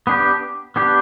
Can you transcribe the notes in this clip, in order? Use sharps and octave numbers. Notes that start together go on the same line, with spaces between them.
B3 D4 G4
B3 D4 G4